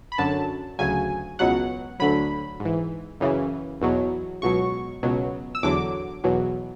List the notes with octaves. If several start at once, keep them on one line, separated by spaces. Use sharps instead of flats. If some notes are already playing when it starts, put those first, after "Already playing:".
B5
F#2 D3 F#3 A5
D2 C#3 F#3 G#5
C#2 B2 F#3 F#5
D2 D3 F#3 B5
G#2 E3
F#2 C#3 E3
E2 B2 F#3
C#2 B2 F#3 C#6
C#2 B2 F#3
E6
E2 D3 F#3 D6
E2 B2 F#3